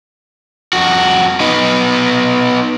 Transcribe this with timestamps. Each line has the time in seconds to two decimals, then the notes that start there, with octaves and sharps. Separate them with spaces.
0.73 F2 F#4
1.40 B3 D#4